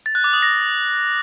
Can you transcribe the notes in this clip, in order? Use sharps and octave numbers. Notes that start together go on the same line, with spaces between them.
A6
F#6
D6
D#6
A#6